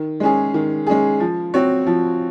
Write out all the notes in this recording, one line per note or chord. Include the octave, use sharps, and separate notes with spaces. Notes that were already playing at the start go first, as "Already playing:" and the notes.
Already playing: D#3
G#3 C#4 G#4
D#3
G#3 C#4 G#4
F3
C4 F#4 C#5
F3